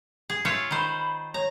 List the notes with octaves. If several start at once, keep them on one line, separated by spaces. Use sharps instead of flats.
G#4
F4 C#5 E5
D#3 C5 B5
C#5 A#5